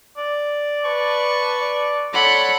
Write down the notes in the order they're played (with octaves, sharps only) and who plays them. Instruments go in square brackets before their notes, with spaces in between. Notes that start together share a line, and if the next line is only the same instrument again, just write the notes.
[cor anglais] D5
[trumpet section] B4 A5 C#6
[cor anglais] D5
[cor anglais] A4 [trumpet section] C#5 D5 C6 [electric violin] F#5 B5